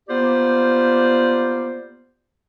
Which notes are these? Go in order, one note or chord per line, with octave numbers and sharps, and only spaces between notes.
A#3 B3 F4 G4 C5 D5